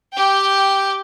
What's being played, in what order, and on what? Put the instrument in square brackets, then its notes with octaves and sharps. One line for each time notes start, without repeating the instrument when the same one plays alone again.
[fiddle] G4 G5